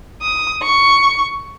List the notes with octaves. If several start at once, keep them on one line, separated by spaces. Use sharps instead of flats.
D#6
C#6